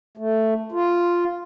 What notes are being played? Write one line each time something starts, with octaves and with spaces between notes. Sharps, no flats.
A3
F4